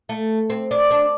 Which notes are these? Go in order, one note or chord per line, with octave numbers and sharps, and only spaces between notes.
A3
C4
D4
D4